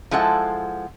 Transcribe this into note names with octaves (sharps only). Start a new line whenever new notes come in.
F3 G#3 E4 A4 F#5